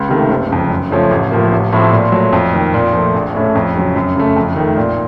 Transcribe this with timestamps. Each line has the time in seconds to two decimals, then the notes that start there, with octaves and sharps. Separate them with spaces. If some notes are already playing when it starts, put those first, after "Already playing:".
Already playing: C#2
0.09 C3 D#3 A3
0.29 F#1
0.50 F2 C#3
0.70 F#2
0.91 C#3 F3 A3 C#4
1.11 A1
1.31 A2 F3 A#3
1.52 A1
1.73 A2 F3 A3 C4
1.93 A#2
2.12 F#3 A3
2.33 F2
2.54 D#3 A#3
2.74 A#2
2.93 F3 A3
3.14 A#1
3.35 A2 A3 C#4
3.56 F2
3.76 C#3 F#3
3.96 F#2
4.16 C#3 A3
4.36 F2
4.56 D#3 A3
4.77 A#2